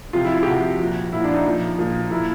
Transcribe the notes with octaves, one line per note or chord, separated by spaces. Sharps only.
C3 F3 F4
E4
F4
G4
C3 F3 F#4
A#2 F3
A#2 F3 E4
D4
D#4
A#2 F3
A#2 F3
A#2 F3 E4